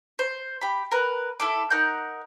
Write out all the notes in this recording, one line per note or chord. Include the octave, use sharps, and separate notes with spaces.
C5
G4 B5
A#4 B4
E4 A4 D6
D#4 A#4 F#5 G6